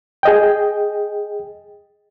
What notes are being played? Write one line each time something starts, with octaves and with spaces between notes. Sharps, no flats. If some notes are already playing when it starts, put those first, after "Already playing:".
G#4 D#5 G5